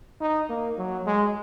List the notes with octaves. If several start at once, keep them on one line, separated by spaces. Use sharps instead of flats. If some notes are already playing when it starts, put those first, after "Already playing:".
D#4
A#3
F#3
G#3